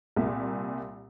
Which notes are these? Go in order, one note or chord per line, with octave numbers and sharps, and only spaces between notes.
C2 A#2 E5